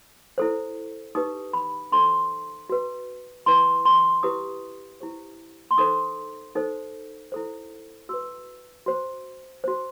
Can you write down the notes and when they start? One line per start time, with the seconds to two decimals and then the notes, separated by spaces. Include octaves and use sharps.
0.38 E4 A4 C5
1.15 D#4 G4 B4 D#6
1.53 B5
1.92 D#4 A4 C5 C6
2.70 F#4 B4
3.46 E4 B4 C6
3.85 C6
4.23 E4 G4 B4 D#6
5.01 E4 G4 C5
5.71 C6
5.78 D#4 A4 C5 D#6
6.55 D#4 A4 C5
7.32 E4 A4 C5
8.09 F#4 B4 E6
8.86 F#4 C5
9.64 F#4 C5